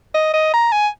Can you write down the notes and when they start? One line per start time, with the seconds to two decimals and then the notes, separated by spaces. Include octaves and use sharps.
0.15 D#5
0.34 D#5
0.54 A#5
0.72 G#5